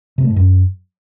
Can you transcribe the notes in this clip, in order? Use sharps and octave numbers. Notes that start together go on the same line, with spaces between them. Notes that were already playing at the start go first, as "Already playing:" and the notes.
C3
A3
G#2
F#2